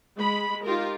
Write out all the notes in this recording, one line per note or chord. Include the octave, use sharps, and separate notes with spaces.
G#3 B5
D#4 F4 G4 A#4